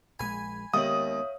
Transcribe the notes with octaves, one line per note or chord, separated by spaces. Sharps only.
A#1 G#3 G#5 B5
D#2 G#3 B3 C#5 E5 F5 D#6